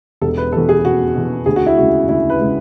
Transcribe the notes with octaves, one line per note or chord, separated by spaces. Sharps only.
E1 A4
B4
E2 B2 A4
G#4
E1 F#4
E2 B2
D2 G#4
F#4
E4
C#3 G#3 F#4
D2 E4
B4
C#3 G#3